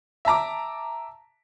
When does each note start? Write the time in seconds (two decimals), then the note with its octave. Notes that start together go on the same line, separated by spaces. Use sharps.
0.25 E5 A5 A#5 D6